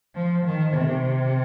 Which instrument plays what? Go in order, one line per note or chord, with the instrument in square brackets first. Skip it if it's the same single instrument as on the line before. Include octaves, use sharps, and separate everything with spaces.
[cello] F3
D#3
C3